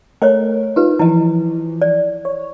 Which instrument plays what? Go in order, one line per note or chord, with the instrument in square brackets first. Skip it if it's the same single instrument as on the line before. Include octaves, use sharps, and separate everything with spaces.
[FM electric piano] A3 A#4 [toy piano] C#5 D#5 G5
[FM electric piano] D#4 F4 [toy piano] G4 B4
[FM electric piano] E3 F3 [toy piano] E4 D#5
[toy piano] D5
[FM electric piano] C#5